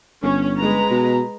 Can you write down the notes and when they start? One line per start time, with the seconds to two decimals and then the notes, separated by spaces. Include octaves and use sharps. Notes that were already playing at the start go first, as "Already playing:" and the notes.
0.23 G1 C#4
0.58 G#3 B4 A#5
0.91 B2